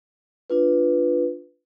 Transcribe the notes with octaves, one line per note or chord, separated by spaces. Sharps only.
D4 F4 B4